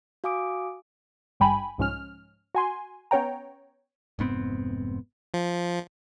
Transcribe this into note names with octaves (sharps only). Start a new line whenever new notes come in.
F#4 F5 G#5 D6 D#6 D7
G#1 G2 G3 G5 G#5 B5
C2 G#2 F3 G#3 C#4 F6
F#4 G#5 C6
B3 C#4 C#5 G5 A#5
F1 G#2 B3 C4
F3